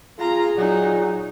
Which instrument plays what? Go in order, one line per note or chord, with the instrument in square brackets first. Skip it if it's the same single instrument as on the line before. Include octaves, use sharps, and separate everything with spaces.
[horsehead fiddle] F4 A#5 [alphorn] G#4
[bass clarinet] A#2 [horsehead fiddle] F#3 D#4